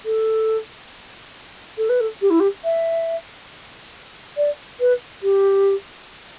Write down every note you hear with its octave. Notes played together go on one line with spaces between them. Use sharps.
A4
A4
B4
A4
G4
E4
G4
E5
D5
B4
G4